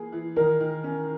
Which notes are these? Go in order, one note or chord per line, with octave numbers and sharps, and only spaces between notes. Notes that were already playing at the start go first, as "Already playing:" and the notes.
Already playing: E3 A#3 G#4
E3
D#3 A#4
D#3
C#4